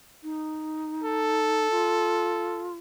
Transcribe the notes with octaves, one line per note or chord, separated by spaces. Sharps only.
D#4
A4
F4